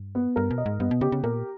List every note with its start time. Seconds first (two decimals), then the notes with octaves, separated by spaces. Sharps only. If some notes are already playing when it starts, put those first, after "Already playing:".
Already playing: G2
0.15 B3
0.36 G2 A#4
0.51 B2
0.58 D#5
0.66 G#2
0.80 G2 B3
0.91 B2
1.01 C#3 G4
1.12 C#3
1.24 A#2 A#4